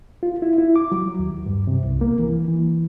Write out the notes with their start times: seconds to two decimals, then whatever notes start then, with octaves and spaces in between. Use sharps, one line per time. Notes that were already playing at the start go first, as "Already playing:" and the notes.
0.23 F4
0.42 E4
0.58 E4
0.76 D6
0.92 F#3
1.19 D#2
1.46 G2
1.67 C3
1.84 C2
2.01 A#3
2.19 E3
2.48 E3